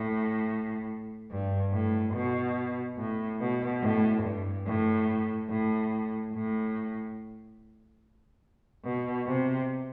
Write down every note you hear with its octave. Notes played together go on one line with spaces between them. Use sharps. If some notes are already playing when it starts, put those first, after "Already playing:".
Already playing: A2
G2
A2
B2
A2
B2
A2
G2
A2
A2
A2
B2
C3